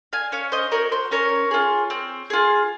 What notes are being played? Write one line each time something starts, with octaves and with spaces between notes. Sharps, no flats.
F5 G#5
C#4 C#5 F5
C5 D#5
F#4 A#4 C#5
C5
C#4 A#4 C#5
F4 G#4
C4
F4 G#4